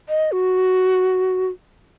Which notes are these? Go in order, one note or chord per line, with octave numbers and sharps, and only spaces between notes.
D#5
F#4